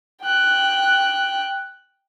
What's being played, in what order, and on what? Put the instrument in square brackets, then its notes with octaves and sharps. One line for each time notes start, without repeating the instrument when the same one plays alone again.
[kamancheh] G5 F#6